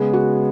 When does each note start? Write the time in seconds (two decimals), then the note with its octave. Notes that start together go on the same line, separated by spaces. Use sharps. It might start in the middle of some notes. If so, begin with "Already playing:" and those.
Already playing: C#3 G#3 B3 G#4
0.13 F#4